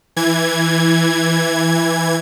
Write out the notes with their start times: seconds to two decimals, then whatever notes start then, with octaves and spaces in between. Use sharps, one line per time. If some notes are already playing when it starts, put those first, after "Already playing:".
0.16 E3 G#6